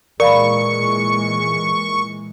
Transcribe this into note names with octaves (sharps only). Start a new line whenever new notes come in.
A#2 E3 G#3 A#4 D5 F5 B5 C#6